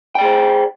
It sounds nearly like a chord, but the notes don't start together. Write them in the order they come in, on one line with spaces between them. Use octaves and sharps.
G5 D5 G#4 C5